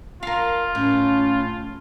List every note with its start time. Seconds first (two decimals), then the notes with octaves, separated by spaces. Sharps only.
0.23 F4 A#4 F5
0.75 A2 C#4